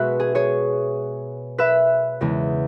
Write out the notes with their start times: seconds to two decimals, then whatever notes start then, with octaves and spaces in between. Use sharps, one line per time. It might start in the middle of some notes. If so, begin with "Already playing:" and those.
Already playing: B2 G#3 F#4 B4 E5
0.20 G#4
0.35 G#4 C#5
1.58 B4 E5
2.21 E2 C#3 G#3